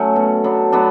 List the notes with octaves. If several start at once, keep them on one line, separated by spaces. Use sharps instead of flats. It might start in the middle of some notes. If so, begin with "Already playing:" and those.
Already playing: F#3 A3 C#4
B2
F#3 B3 D4
F#3 B3 D4